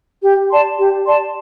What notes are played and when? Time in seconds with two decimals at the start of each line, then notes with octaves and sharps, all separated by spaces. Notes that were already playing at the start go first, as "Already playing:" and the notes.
0.22 G4
0.50 D5 A5 C6
0.77 G4
1.05 D5 A5 C6